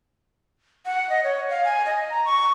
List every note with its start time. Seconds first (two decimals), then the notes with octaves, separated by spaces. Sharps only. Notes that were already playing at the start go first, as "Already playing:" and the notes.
0.86 F#5
1.10 D#5
1.24 C#5
1.50 F5
1.64 G#5
1.86 D#5
2.10 A#5
2.25 C#6